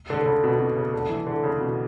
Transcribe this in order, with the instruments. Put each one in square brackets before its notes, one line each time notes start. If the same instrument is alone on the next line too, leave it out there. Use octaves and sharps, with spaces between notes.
[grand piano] D3
D3
C#3
B2
B2
C#3
D3
E3
D3
C#3
B2